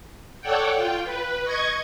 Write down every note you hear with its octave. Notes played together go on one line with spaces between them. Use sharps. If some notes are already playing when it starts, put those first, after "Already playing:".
A4 C#5 D5 F#5 G5
F4 G5
B4
D#5 C#6 G#6